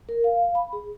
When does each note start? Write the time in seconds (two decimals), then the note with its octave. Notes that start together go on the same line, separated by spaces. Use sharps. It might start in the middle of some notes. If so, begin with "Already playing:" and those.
0.09 A#4
0.24 F5
0.55 B5
0.73 G#4